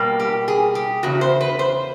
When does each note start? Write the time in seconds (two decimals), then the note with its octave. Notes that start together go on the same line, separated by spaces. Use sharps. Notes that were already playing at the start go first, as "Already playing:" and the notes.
Already playing: B2 G3 A#3
0.20 G4
0.48 G#4
0.75 G4
1.03 E2 C#3 F#4
1.21 C5
1.41 B4
1.59 C5